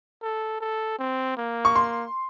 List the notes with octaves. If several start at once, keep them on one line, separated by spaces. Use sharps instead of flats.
A4
A4
C4
A#3
C#6
C6